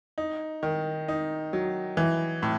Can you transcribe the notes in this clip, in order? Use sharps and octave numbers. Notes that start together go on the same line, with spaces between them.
D#4
D#3
D#4
F#3
E3
A2